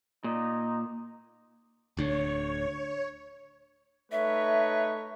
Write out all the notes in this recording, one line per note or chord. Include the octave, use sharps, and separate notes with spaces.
A#2 D#4
D1 D2 D3 C#5
A3 D#4 B4 C#5 E5